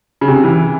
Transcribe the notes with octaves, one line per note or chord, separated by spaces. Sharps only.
C#3
C3
E3